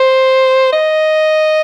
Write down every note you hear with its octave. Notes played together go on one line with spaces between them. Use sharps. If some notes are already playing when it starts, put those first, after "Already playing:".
Already playing: C5
D#5